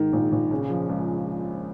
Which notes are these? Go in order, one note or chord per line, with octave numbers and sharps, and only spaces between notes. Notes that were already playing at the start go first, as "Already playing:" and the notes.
Already playing: G#2 D#3
A#1
A#1
C#3
F3
C#2